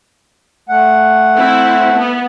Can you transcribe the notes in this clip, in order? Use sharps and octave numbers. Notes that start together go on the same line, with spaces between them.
A3 F#5
C4 E4
B3